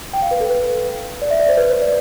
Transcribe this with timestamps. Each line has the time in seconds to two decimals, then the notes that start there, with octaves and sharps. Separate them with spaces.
0.13 G5
0.22 F5
0.31 B4
0.40 A4
0.49 B4
1.22 D5
1.30 E5
1.40 D5
1.49 C5
1.57 B4
1.69 C5
1.82 D5